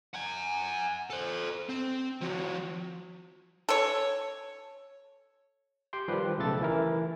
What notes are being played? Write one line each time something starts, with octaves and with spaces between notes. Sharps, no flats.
F#5 G#5
A4 C5
C4
F3 F#4
A4 C#5
G4 G5 C6
D#3 F3 G3 G4 B4
B1 C#3 A3 A4 A6
E3 E4 A#4